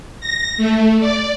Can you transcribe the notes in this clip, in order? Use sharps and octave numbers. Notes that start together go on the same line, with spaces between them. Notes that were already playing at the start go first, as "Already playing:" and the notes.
A#6
A3
D5